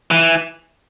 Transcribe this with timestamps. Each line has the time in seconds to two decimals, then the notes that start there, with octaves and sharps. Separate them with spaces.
0.11 E3